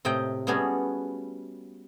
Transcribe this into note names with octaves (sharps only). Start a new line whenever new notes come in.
A2 C3 D#5 G5
G3 A3 B3 C#4 F#4 G#4